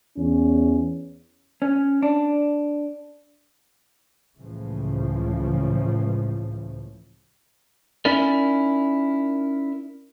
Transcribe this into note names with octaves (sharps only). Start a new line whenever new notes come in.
E2 C#4
C#4
D4
C#2 A2 C#3 E3 F3
C#4 D#4 E4 A#4 D5